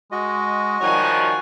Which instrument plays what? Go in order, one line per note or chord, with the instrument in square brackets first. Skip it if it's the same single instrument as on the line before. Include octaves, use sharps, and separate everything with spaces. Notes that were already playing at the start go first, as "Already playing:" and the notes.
[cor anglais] G#3 [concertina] F#4 D#5
[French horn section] D#3 F3 G3 [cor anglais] C#5 [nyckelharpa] F#5 G#5